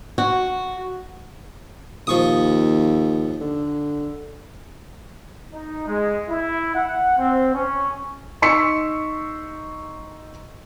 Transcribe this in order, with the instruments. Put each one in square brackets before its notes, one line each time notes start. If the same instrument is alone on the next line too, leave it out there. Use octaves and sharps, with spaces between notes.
[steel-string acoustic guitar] F#4
[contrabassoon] D#2 [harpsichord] F3 C#6 D#6
[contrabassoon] D3
[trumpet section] D#4
G#3
E4
F#5
C4
C#4
[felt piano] D#4 C6 C#6 E6 B6 C#7